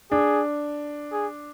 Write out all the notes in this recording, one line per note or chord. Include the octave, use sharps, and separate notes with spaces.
D4 G#4
G#4